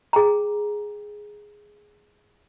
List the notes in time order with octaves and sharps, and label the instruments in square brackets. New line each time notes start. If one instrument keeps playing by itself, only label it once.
[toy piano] G#4 G5 A#5